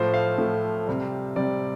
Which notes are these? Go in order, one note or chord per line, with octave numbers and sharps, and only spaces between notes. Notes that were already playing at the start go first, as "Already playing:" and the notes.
Already playing: A2 F3 A3 C5
F5
A2 F3 A3
C3 G3
C3 G3 D5